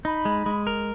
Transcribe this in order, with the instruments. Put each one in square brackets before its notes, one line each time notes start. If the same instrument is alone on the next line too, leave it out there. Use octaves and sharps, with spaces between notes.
[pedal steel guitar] D#4 [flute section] B5
[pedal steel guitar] G#3
G#3
A#4